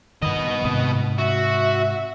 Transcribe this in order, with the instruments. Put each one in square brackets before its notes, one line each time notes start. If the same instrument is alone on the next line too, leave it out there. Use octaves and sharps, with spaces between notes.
[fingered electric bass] G2 D#3 [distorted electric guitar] B3 D#5
[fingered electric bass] G#2 C3
[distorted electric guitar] F#4 [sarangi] E5